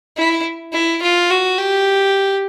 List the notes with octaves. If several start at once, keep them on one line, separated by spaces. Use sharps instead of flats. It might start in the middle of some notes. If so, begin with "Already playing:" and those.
E4
E4
F4
F#4
G4